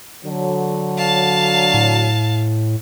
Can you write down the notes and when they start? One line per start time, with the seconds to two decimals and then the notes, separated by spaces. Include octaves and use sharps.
0.25 D3 F#3
0.98 F5 A5
1.74 A2